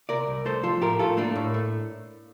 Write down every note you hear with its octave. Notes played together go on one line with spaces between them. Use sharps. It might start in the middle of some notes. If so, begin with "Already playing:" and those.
C3 A#4 D5
C2
A3 A4 C5
F3 F4 A4
A2 G4 A#4
A2 F4 A4
A3 A#3 D4
A2
A3